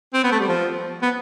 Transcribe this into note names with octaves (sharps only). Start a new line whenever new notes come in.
C4
B3
A3
G3
F3
B3